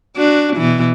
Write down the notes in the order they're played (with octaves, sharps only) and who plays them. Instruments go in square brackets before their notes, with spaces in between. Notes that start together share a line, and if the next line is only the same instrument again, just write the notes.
[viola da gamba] D4 F#4
B2 E3